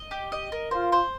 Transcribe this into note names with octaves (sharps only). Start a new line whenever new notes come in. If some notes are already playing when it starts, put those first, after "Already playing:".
Already playing: D#5
G4
D#5
A#4
F4 C5
C5